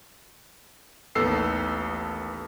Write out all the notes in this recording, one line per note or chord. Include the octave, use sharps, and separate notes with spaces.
A1 D#2 B3 A4 E6 C7